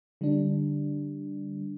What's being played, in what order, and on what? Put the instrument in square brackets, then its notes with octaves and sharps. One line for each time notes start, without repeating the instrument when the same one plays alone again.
[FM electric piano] D3 G3 D4